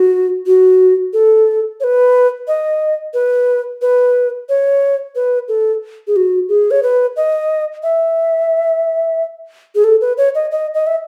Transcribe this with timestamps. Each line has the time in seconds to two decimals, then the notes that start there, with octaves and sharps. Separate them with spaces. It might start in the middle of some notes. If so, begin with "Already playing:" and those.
Already playing: F#4
0.46 F#4
1.13 A4
1.80 C#5
1.84 B4
2.48 D#5
3.14 B4
3.82 B4
4.49 C#5
5.15 B4
5.48 A4
6.07 G#4
6.16 F#4
6.49 G#4
6.71 C#5
6.83 B4
7.16 D#5
7.83 E5
9.75 G#4
9.84 A4
10.01 B4
10.18 C#5
10.35 D#5
10.51 D#5
10.74 D#5
10.87 E5